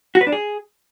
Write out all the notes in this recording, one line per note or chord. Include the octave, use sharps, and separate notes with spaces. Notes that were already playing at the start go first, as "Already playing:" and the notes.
F#4
B4
D4
G#4